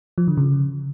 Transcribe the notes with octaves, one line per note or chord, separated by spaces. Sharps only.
F3
D3
C#3